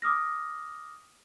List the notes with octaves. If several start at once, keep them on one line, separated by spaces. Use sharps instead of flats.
D6 D#6 F6 A#6